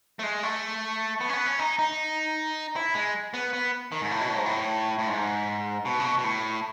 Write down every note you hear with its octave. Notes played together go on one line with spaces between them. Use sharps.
A3
G#3
A3
B3
C#4
B3
C#4
D#4
D#4
E4
G#3
B3
B3
D#3
G#2
A2
B2
A2
G#2
A2
A2
G#2
B2
C#3
B2
B2
A2